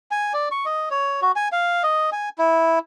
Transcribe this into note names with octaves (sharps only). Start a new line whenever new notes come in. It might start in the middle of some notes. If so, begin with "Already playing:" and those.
G#5
D5
C#6
D#5
C#5
F#4
G#5
F5
D#5
G#5
E4